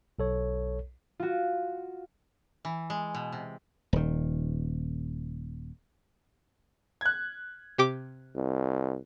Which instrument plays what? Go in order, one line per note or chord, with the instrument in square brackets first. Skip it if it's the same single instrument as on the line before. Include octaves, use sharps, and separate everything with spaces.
[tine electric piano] B1 A4 C#5
[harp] F4 F#4
[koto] E3
G#3
B2
C3
[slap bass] D#1 D#3
[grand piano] F#6 G#6
[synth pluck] C3 G4 D6
[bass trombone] C2